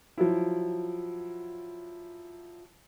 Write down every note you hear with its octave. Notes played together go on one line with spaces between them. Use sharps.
F3 F#3 E4